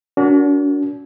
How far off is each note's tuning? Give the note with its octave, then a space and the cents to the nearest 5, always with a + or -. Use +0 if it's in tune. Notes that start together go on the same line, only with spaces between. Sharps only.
D4 -45 F#4 +0 A#4 +0